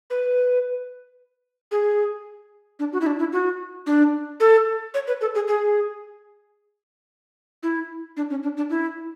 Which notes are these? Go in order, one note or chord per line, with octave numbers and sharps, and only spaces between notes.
B4
G#4
D4
F#4
E4
D4
E4
F#4
D4
A4
C#5
B4
A4
G#4
G#4
E4
D4
C#4
D4
D4
E4